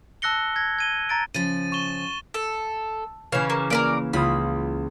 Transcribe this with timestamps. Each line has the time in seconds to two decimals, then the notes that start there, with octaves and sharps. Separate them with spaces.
0.22 A5 E6 F#6 A#6 C#7 G7
0.56 G#6 A#6
0.78 G#6 D#7 G7
1.09 A#5 A6 D7
1.34 C#3 F3 A6 D#7
1.72 C#6 E7 G7
2.34 A4
3.32 C#3 E3 C#5 F5
3.50 A#3
3.70 A#3 A#4 B4 D5
4.13 C#2 F4 B5 D#6